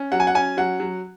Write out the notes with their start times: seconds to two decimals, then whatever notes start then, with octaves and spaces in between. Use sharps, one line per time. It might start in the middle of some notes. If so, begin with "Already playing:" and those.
Already playing: C#4
0.12 F#3 F#5
0.20 G#5
0.27 F#5
0.35 C#4 G#5
0.57 F#3 F#5
0.80 F#3